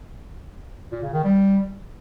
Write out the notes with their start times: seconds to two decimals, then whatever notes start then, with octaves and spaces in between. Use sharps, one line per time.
0.92 A#2
1.03 C#3
1.13 D#3
1.24 G3